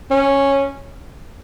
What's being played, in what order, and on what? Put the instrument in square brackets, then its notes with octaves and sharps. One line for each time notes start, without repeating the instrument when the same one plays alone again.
[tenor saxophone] C#4